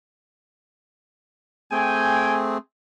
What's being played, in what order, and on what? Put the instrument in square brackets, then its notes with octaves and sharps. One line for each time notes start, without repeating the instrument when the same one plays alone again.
[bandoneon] A3 C4 G#4 [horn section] G5 G#5